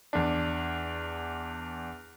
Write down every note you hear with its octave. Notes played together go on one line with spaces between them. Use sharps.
E2 D4